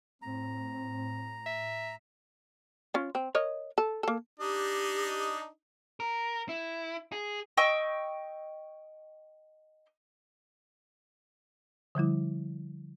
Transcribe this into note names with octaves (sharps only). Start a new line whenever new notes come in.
A2 C4 A#5
E5
C#4 F4
C4
A#4 C#5 D#5
A4
A#3 A4
D4 D#4 G4 D#5
A#4
E4
G#4
D#5 G5 C#6 E6
D3 F3 G3 E4